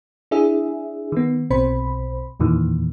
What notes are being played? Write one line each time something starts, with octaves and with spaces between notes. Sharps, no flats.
D4 E4 G#4 E5
D#3 B3
B1 B2 C4 C5 B5
E2 A#2 D#3 E3